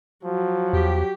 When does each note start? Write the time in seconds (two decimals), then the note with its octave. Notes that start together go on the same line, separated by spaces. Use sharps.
0.24 F3 F#3
0.73 E2 G4